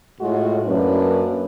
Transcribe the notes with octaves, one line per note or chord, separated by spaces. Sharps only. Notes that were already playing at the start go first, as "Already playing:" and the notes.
A2 G#3 F4 F#4
F#2 A#3 D4 B4